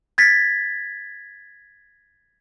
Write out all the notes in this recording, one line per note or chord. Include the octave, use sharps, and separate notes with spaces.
G#6 A6 B6